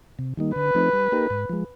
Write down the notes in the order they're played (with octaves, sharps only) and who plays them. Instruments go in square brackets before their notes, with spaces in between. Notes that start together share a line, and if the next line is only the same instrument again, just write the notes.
[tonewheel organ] C3
D#3 G3 A#3 D#4
[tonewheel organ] D3 [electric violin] B4
[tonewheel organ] F3 A3 C4 D#4
G3
A#3 D#4 G4 A#4
G#2
F3 G#3